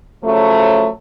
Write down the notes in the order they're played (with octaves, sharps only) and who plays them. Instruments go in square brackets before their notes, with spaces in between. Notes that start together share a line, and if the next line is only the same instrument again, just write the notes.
[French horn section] C#3 F3 F#3 A3